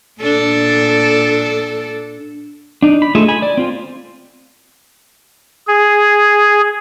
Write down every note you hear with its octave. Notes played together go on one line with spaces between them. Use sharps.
A#2 D4 A4
D4 D#4
B5
A3 F4 G#4 D#5 E5
G#5 B5
D5
C4 F4
G#4